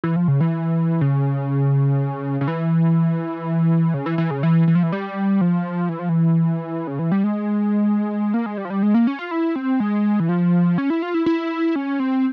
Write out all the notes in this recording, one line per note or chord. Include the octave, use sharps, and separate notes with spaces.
E3
F3
C#3
E3
C#3
C#3
E3
C#3
E3
E3
C#3
E3
E3
F3
E3
G3
F3
E3
F3
E3
C#3
E3
G3
G#3
A#3
G#3
G3
F3
G3
G#3
A#3
C#4
F4
E4
C4
G#3
E3
F3
C#4
E4
F4
E4
E4
C#4
C4